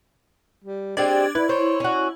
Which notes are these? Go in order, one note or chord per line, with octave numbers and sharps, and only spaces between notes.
G3
G#3 C4 D4 G4 D5 G#6 A6
E4 B4
C5 C#5
C#4 F#4